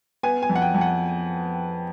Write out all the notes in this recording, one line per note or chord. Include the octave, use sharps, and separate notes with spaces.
B3 G#5
G#5
F2
F#5
G5
F2
F#5